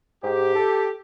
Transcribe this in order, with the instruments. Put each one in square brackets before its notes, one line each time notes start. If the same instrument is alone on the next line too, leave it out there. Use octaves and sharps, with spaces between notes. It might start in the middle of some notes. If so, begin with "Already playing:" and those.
[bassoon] G#2 [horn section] G4
[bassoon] A4